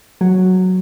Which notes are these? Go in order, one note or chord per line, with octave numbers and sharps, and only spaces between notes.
F#3